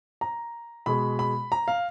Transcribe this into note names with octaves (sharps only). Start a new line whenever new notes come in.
A#5
B2 G#3 B5
B5
A#5
F5